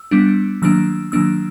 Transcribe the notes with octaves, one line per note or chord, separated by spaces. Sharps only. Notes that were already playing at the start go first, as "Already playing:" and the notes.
Already playing: E6
G3 B3 D4
D#3 F#3 A#3 D4 E6
D#3 F#3 A#3 D4 E6